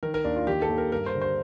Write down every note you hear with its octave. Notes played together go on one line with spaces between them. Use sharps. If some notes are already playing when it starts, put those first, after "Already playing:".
D#3 A#4
A#4
D#2 D4
F4
D#3 G4
A4
D#2
A#4
G2 A#4
C5
D3
C5